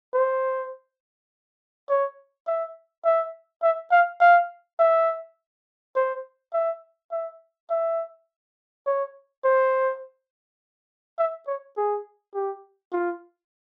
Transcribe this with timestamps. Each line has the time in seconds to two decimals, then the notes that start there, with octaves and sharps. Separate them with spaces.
0.14 C5
1.89 C#5
2.47 E5
3.05 E5
3.63 E5
3.91 F5
4.20 F5
4.79 E5
5.96 C5
6.53 E5
7.12 E5
7.70 E5
8.87 C#5
9.44 C5
11.18 E5
11.47 C#5
11.77 G#4
12.34 G4
12.92 F4